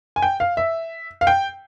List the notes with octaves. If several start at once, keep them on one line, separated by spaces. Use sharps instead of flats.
G#5
G5
F5
E5
F5
G5